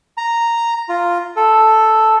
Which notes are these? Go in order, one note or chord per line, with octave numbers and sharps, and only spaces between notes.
A#5
F4
A4